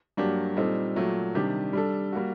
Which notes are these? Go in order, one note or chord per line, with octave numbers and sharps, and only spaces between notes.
G2 F#3 A#3 D4 G4
A#2 G3 C4 D#4 A4
A#2 F#3 A3
C3 D#3 G3 D4 G4
G3 D4 A4
G3 A#3 F#4